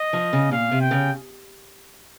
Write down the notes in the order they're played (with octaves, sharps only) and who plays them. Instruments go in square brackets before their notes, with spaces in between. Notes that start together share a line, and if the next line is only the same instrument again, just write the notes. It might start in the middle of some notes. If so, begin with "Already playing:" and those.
Already playing: [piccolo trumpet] D#5
[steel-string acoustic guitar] F3
C#3
[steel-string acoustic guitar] A#2 [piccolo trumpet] F5
[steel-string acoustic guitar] C3
[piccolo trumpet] G5
[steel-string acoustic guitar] C#3